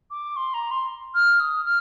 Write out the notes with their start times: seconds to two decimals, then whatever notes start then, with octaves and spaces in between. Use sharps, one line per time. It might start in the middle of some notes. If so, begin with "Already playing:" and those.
0.11 D6
0.36 C6
0.54 A#5
0.71 C6
1.14 F6
1.40 D#6
1.65 F6